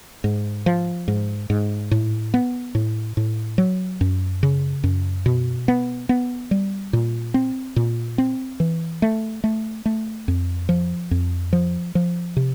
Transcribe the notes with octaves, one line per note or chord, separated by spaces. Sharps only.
G#2
F3
G#2
G#2
A2
B3
A2
A2
F#3
F#2
C#3
F#2
B2
B3
B3
G3
A#2
C4
A#2
C4
E3
A3
A3
A3
F2
F3
F2
F3
F3
C3